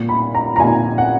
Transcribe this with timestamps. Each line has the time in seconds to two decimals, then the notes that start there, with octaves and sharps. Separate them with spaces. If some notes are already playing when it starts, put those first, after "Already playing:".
Already playing: A#2
0.09 B5
0.35 A#5
0.56 A#5
0.59 A#2 G#5
0.98 F#5